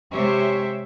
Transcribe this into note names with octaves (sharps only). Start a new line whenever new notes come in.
C3 G#3 G4 C5 C#5 E5